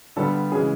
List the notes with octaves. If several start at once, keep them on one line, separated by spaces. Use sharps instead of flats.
G2 D3 G3 B3 A4
C#3 E3 G#3 G#4